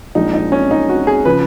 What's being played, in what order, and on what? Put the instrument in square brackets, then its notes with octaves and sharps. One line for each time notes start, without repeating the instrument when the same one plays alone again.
[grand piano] A#1 A#2 F3 G#3 [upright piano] D#4
[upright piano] D#4
C#4
D#4
F#4
G#4
[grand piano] C#3 F3 [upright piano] B4